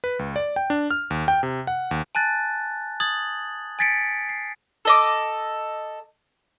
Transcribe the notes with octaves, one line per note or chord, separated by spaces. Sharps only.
B4
C#2
D5
G5
D4
F6
D#2
G5
C3
F#5
D#2
G#5 A5 F#6 A6
D#6 G#6 A6 F#7
G#5 G#6 A6 B6 C#7 D7
C7
A4 D#5 D6